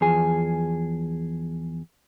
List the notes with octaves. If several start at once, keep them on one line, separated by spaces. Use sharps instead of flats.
E2 F3 G#4 G#5